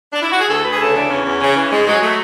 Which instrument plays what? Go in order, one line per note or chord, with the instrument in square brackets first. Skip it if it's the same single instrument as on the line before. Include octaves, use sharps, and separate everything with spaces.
[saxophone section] D4
E4
F#4
G#4
D2 A4
D2 B4
G#4
C#3 A4
E3 D4
E2 C#4
E2
C#3
E3
G#2 G#3
F#3 G#3
F#3 A3